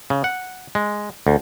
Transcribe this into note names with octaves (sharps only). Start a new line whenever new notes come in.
C#3
F#5
G#3
D2